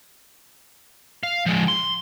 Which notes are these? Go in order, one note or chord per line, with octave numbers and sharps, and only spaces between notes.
F5
F3 G#3
C6